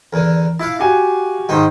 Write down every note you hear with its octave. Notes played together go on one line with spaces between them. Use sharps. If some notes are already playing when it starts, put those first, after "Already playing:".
E2 D3 A#4
E4 F5 F#5 A5
F#4 G4 G#5
G#2 D#3 D#4 C5 G5